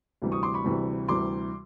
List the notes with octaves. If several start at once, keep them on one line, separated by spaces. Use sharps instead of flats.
D2 C3 E3 G3
C#6 D#6
C6 D6
B5 C#6
D2 C3 E3 G3
D2 C3 E3 G3 C6 D6